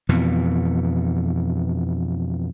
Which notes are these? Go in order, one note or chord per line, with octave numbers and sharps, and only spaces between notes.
F2 B2 E3